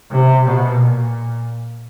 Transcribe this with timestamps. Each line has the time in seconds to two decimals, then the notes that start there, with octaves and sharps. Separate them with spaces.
0.11 C3
0.44 B2
0.75 A#2